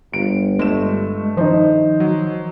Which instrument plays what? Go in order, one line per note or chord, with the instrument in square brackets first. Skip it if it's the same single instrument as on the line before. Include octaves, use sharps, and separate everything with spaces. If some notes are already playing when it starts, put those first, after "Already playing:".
[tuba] G1 [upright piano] D7
[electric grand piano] G2 A3 E7 [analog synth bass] G#3
[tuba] D#3 [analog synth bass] F3 [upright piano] D#4 C5
[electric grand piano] F#3